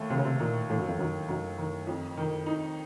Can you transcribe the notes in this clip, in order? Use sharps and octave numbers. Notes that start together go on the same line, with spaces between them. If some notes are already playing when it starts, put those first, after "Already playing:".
Already playing: D#2 A3
D#2 C3
C#3
C3
A#2 D#3
D#2 A2
F#2
F2
F#2 D#3
F#2 D#3
D#3
F2
D#3
D#4